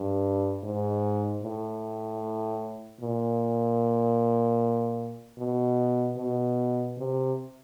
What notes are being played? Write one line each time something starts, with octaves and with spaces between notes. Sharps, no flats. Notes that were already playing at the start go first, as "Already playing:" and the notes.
Already playing: G2
G#2
A2
A#2
B2
B2
C3